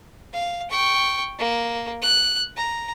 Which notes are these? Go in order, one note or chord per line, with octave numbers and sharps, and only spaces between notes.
F5
G5 C#6
A#3
F#6
A#5